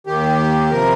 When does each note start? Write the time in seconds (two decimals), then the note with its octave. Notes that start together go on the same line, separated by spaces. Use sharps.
0.07 D#2 D#3 G4
0.71 C3 F3 A#4